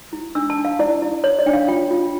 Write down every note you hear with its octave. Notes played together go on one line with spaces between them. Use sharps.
E4
D4 E6
A5
D4
F5
E4 D5
E4
C#5
D5
D4 G5
F5
F4 G5
F4